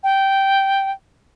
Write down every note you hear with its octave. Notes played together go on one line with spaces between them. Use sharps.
G5